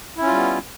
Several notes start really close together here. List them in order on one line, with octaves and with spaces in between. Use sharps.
E4 C#4 F4 G3 B3